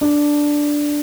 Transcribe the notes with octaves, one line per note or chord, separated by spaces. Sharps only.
D4